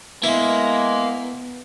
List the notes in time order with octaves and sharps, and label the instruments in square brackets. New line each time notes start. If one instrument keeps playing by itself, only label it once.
[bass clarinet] G#3 [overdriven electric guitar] A#3 [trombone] B3 [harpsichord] E4